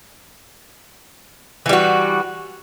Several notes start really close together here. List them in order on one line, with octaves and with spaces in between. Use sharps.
E3 G3 F#4